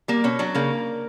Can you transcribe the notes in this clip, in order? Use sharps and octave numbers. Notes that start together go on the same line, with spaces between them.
G3 A#3
B2 C#4
F#3 D4
C#3 A#3